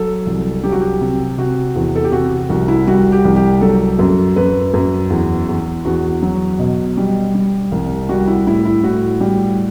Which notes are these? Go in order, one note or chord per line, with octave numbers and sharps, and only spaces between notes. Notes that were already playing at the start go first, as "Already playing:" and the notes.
Already playing: F#3 A4
C2
F#3 G4
F#4
G4
C3
C3 F#4
E2
A4
G4
C3 F#4
C2 F#4
E4
G3 F#4
G4
C2
G4
F#3 A4
F#2
F#2 B4
F#2
E2
E2
E2 F#4
F#3
B2
G3
G3
C2
G3 F#4
E4
A2 E4
E4
A2 F#4
G3